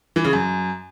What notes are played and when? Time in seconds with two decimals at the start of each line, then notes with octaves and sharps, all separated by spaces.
0.16 E3
0.24 C#3
0.33 F#2